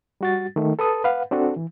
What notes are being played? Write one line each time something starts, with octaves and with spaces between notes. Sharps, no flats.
G3 F#4 A6
D#3 A3
A4 B4 A5 D#6
B4 F5 F#5
C4 D4 F#4 A4
E3